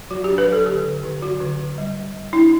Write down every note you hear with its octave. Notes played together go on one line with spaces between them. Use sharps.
F#3 F#4
D4 G4
B4
F#3
A4
D3 G4
D3
D3
F#3 F#4
D3
D3
G3
G3
G3
D4 E4